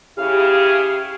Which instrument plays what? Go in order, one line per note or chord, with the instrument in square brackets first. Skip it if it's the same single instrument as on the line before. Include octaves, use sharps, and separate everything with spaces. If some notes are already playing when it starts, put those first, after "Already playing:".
[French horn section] C#3 E4 G#4 [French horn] G4 [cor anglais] F5